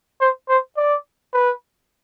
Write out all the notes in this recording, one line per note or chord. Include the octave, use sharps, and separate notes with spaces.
C5
C5
D5
B4